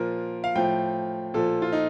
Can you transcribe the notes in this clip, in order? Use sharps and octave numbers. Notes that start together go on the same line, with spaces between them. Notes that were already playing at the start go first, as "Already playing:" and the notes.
Already playing: A#2 F3 A#4
F5
A2 F3 G5
A#2 F3 A4
F4
D#4